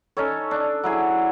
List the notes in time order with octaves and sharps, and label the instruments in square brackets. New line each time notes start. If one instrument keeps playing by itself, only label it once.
[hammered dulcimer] C#4 D#4 A4 C#5
D4
F#3 E4 G#4